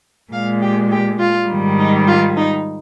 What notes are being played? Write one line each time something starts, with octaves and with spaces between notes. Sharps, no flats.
A#2 G#3 F5
G4
G4
F4
G#2 D#3 G3
D#4
F4
D#4